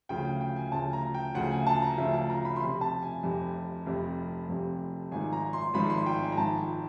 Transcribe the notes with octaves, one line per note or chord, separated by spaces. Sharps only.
D2 C#3 F3 G5
G5
G5
G#5
D2 C#3 F3 A5
A#5
G5
D2 C#3 F3 F#5
G#5
A5
A#5
D2 C#3 F3 E5
A5
A#5
B5
C6
F1 F2 C3 B5
A5
G#5
F1 F2 C3
F1 F2 C3
F1 F2 C3
G#1 G#2 F3 G#5
A#5
C6
G#1 G#2 F3 B5
C6
G5
G#5
A#5
G#1 G#2 F3 A5
G5